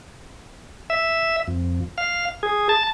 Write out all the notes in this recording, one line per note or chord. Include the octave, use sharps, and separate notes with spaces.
E5
F2
F5
G#4
A5